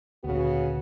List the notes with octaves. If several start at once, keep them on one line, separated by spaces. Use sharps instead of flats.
D2 A#2 C#3 B3 F#4